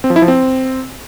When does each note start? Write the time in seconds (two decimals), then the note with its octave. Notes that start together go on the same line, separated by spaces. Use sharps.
0.04 C4
0.10 F3
0.16 E4
0.22 F3
0.28 C4